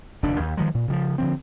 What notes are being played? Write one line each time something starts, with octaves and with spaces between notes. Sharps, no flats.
F1 D#2 D3 D4
D#2
D#3 F3 F#3 G#3
A#2
C#3 E3 F3
D3 F3 C4